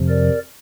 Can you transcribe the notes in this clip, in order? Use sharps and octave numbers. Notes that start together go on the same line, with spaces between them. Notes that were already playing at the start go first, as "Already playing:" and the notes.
Already playing: F2 C3 F3
A#4 D5